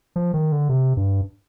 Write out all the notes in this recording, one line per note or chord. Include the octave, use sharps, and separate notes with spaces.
F3
D#3
D3
C3
G2